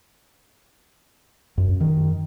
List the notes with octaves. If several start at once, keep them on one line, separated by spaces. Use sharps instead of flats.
F#2
D#3